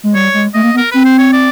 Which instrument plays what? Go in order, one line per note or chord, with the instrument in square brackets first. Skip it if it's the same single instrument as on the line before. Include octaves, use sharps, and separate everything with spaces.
[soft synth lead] G#3
[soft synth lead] G3 [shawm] C#5
[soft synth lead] G#3
[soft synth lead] A3 [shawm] D#5
[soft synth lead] A#3
B3
[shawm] A#4
[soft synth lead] C4 [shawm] B4
[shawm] C5
C#5
D5